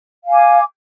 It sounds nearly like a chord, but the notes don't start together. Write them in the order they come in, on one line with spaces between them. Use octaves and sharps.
F5 G#5 D6